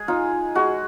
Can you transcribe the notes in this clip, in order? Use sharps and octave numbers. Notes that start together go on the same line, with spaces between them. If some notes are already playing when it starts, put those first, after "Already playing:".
Already playing: G#3 G#4
D#4 F4
G#3 F#4